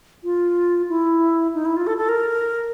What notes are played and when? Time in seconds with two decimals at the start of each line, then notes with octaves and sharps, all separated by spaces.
0.24 F4
0.89 E4
1.54 D#4
1.65 E4
1.77 F4
1.87 A4
1.97 A4
2.09 A#4